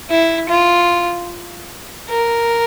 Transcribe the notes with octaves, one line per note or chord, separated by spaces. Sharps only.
E4
F4
A#4